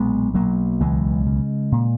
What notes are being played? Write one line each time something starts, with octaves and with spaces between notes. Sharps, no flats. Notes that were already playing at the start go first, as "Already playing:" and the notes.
Already playing: B1 A#2 G#3 B3
B1 F#3 A#3
C#2 E3 G#3
C#3
A#2